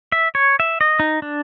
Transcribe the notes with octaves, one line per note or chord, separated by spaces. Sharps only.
E5
C#5
E5
D#5
D#4
D4